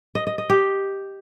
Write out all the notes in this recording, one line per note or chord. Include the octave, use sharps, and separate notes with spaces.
D#5
D#5
D#5
G4